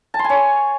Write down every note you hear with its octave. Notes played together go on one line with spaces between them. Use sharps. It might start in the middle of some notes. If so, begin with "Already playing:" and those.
A5
C6
G#5
C#5